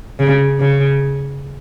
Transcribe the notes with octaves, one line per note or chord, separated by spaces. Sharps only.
C#3
C#3